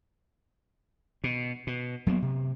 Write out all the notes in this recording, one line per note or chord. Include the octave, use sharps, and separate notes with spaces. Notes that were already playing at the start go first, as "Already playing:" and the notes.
B2
B2
F#3 G3 A#3 B3
C3